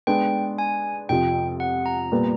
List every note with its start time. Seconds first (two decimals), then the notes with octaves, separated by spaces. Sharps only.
0.07 G#3 B3 D4 G5
0.58 G#5
1.09 F2 C3 F3 G5
1.60 F#5
1.86 A#5
2.12 A#2 G3 B3